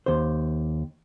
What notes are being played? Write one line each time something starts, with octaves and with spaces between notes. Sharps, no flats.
D#2 C5